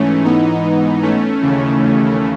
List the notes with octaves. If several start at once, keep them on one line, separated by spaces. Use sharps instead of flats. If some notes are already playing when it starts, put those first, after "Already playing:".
Already playing: G#2 E3 A3 C#4
B3 D#4
A3 C#4
D#2 C#3 E3